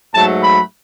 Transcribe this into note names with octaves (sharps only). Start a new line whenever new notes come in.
G#2 F#3 A3 A5
B5